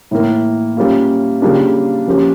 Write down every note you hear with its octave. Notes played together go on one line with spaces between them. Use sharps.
A2 E3 A#3
G3 A#3 C#4 F4
C#3 G3 A#3 D4 F4
F3 A#3 C#4 G4